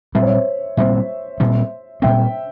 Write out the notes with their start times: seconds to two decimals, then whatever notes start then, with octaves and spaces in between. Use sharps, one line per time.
0.15 A#2 G3 C4 E5
0.23 C#5
0.29 C5 E5
0.77 A#2 G3 C4 C5 E5
1.40 A#2 G3 C4
2.02 A#2 G3 C4 E5 G5